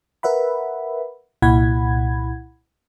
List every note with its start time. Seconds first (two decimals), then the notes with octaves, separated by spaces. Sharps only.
0.23 A#4 B4 E5 F#5 B5
1.42 C2 A#2 E4 F#5 B5 G#6